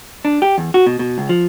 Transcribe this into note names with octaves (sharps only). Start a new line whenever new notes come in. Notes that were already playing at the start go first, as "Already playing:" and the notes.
D4
G4
E2
F#4
B2
B2
C#2
F3